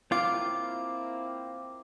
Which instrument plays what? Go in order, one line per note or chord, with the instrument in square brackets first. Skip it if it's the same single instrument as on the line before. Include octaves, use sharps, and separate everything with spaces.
[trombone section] A#3 C4 E4 [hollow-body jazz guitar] F4 [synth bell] D6